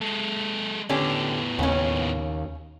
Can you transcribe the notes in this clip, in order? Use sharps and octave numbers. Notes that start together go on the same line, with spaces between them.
G#3 A4
A2 D3 B3 C#4 G4
D#2 C#3 C#4